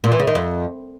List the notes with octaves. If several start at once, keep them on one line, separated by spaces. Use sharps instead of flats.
A#2
E3
C#3
D#3
F2